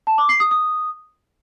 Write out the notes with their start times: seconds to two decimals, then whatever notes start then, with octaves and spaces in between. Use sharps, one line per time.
0.07 A5
0.18 D6
0.29 C7
0.40 D#6
0.51 D#6